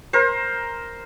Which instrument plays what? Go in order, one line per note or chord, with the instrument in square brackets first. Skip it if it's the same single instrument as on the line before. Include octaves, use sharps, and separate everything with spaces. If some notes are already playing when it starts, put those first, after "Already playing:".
[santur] A#4 C5